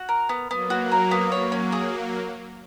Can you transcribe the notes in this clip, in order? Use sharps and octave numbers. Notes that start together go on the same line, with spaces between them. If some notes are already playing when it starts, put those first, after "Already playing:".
Already playing: F#4
A#4
B3
F#3 A#3 B3
F#4
A#4
B3
F#3 A#3 C#5
C#4
G#4